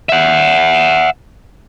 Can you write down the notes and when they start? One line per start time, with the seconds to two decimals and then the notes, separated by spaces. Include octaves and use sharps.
0.09 E5 F#5